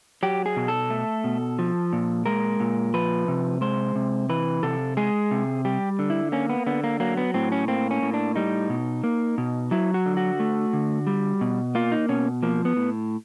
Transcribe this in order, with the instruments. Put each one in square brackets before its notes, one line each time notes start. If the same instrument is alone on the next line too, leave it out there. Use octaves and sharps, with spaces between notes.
[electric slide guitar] F#3 G4
G#4
B2
A4
A3
B2
F3
A#2
G#3 A#4
A#2
F3 B4
C3
G#3 C5
C3
E3 B4
C3 A4
G#3 G#4
C3
G3 G4
D3
E4
A#3 C#4
B3
D3 B3
A#3
F#3 A#3
B3
A2 C4
C#4
A#3 C4
C#4
A2
D4
G3 D#4
B2
A#3
B2
F#3 E4
F#4
D3
F#4
A3
D3
G3
B2
A#3 F4
D#4
B2 C#4
F3 A#3
B3
A2